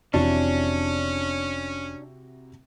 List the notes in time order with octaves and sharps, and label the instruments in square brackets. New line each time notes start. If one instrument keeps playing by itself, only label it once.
[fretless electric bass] F1 F2 E3 [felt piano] C3 E4 F#4 [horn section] C#4 [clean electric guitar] D4